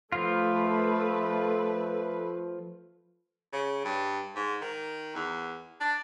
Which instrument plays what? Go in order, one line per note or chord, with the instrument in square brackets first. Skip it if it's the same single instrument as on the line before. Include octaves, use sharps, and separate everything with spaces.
[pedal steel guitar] F3 F4 [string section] A3 B4
[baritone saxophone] C#3
G2
G#2
D#3
E2
D4